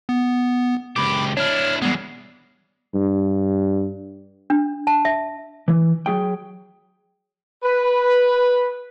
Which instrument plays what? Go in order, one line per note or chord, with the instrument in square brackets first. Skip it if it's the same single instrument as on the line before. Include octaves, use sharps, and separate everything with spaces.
[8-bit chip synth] B3
[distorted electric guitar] C#2 G4 [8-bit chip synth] B5 D6
[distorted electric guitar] D4 E4 [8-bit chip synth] C#5 F6
[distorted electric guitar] E3 G#3 [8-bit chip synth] G3 B3
[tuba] G2
[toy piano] D4
A5
E5
[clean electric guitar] E3
F#3 G#4 G5
[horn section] B4